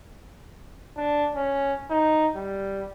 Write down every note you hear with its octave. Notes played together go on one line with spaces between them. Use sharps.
D4
C#4
D#4
G3